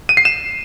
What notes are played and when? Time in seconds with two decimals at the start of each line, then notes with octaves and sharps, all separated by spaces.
0.09 D#7
0.17 C7
0.25 E7